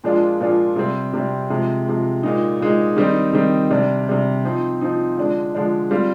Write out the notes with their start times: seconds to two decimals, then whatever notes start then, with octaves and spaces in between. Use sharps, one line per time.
0.04 A#2 F3 G#3 D4 F4
0.40 A#2 F3 G#3 D4 F4
0.76 C3 G3 C4
1.13 C3 G3 C4
1.50 C3 F3 G#3
1.87 C3 F3 G#3
2.23 A#2 G#3 D#4
2.60 A#2 G#3 D#4
2.96 D#3 G3 C4 D#4
3.33 D#3 G3 C4 D#4
3.71 C3 G3 D4
4.08 C3 G3 D4
4.45 F3 C4 D#4
4.81 F3 C4 D#4
5.17 D3 F3 G#3 D4
5.55 D3 F3 G#3 D4
5.91 G3 C4 F4